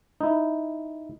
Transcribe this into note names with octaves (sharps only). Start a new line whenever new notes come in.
D#4 E4